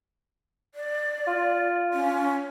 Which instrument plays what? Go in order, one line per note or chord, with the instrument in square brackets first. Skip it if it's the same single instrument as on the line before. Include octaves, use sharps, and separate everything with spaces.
[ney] D5
[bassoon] F4
[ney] C#4